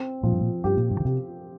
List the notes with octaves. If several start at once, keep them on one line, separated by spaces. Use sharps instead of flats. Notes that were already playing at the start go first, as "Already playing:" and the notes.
Already playing: C4
A#2 F3
G2
A#2
G2 G4
A#2
G2
D#3
C3 G4